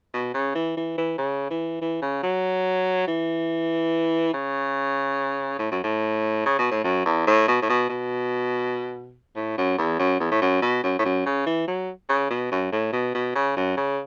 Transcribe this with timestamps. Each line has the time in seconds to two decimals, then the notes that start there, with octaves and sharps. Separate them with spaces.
0.14 B2
0.34 C#3
0.55 E3
0.77 E3
0.98 E3
1.18 C#3
1.50 E3
1.82 E3
2.02 C#3
2.23 F#3
3.08 E3
4.34 C#3
5.59 A2
5.72 F#2
5.84 A2
6.46 C#3
6.59 B2
6.72 A2
6.84 F#2
7.06 E2
7.27 A2
7.48 B2
7.62 A2
7.69 B2
7.90 B2
9.36 A2
9.58 F#2
9.78 E2
9.99 F#2
10.20 E2
10.32 A2
10.42 F#2
10.62 B2
10.84 F#2
10.99 A2
11.05 F#2
11.26 C#3
11.46 E3
11.68 F#3
12.10 C#3
12.31 B2
12.52 F#2
12.73 A2
12.93 B2
13.15 B2
13.35 C#3
13.57 F#2
13.77 C#3